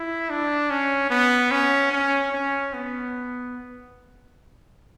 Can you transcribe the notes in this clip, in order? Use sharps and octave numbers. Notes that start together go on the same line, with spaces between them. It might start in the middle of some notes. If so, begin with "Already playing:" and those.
Already playing: E4
D4
C#4
B3
C#4
C#4
C#4
B3